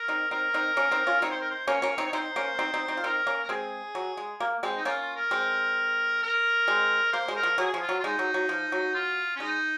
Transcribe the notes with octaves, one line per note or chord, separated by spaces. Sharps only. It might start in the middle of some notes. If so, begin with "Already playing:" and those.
Already playing: A#4
C4 D#4
C4 D#4 A#4
C4 D#4
A#3 C#4
C4 D#4
C#4 F4
C4 D#4 C#5
C5
A#4
C5
A#3 C#4 C#5
A#3 C#4
C4 D#4
C#5
C4 D#4 C5
A#3 C#4
C4 D#4
C4 D#4
C4 D#4
F4
C4 D#4 A#4
A#3 C#4
A#4
G#3 C4 G#4
F#3
G#3
A#3
G#3 C4
D#4
A#3 C#4 F4
F4
A#4
G#3 C4
A#4
G#3 C4
A#3 C5
G#3
A#4
F3
F#3 G#4
F3
F4
F#3
F4
G#3 D#4
F#3
F#3
F3
F#3
F4
C#4
G#3 D#4